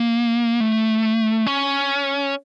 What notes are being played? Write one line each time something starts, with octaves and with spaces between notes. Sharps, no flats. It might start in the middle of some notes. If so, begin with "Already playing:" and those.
Already playing: A#3
A3
C#4